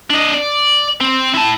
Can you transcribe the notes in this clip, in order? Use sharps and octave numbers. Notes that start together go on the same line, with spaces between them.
D4 D#5
D5
C4
E4 A5